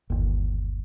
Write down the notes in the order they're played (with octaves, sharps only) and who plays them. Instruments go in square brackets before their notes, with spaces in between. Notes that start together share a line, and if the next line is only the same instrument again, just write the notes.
[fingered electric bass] G1 D#2